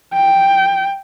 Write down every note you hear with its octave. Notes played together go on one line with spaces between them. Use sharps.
G5